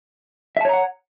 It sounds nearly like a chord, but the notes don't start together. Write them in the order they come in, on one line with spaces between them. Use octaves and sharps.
E5 A5 C#5 A#5 F#5